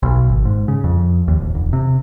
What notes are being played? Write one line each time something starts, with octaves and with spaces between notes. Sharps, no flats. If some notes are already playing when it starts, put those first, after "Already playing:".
B1
G#1
G#2
C#3
F2
D#2
D1
E1
C3